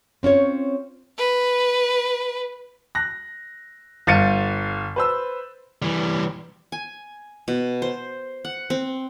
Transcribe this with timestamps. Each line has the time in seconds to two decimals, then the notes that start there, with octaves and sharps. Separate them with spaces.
0.23 C4 C#4 F4 C#5
1.17 B4
2.95 F#6 A#6
4.07 G1 F5 G6 A6 C#7 D#7
4.96 B4 C5 E6
5.82 E3 G3
6.72 G#5
7.48 B2
7.82 C5
8.45 F#5
8.70 C4